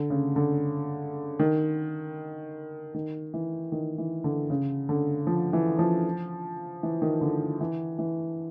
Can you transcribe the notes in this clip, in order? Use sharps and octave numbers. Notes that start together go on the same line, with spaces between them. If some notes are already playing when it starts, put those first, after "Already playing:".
Already playing: D3
C#3
D3
D#3
D#3
E3
D#3
E3
D3
C#3
D3
F3
E3
F3
E3
D#3
D3
E3
E3